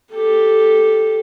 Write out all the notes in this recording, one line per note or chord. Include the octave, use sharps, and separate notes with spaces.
G4 A4